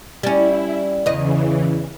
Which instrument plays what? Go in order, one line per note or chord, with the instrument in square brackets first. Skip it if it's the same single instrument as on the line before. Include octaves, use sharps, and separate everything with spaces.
[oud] G3 C#4 [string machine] E4
[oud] E2 D#5 [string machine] C#3 E3